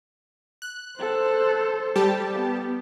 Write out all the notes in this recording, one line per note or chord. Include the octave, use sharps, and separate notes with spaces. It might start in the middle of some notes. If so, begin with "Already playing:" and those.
F#6
A4 C5
G3 G4 A5
B3